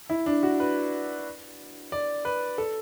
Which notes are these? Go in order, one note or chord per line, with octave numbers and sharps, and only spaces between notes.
E4
D4
F#4
B4
D5
B4
A4